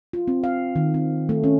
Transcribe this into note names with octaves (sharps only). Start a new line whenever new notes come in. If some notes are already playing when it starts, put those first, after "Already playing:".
F4
C4
F5
D#3
C4
A3
C#4